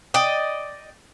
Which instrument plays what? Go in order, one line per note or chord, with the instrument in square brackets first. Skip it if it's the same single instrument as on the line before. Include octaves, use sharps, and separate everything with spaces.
[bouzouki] D5 D#5 G5